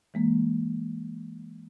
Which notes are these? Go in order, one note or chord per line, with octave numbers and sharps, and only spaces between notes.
E3 G#3 A#3